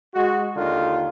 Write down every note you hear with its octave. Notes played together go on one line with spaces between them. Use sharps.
G#3 F#4
D#2 D3 D#3 F4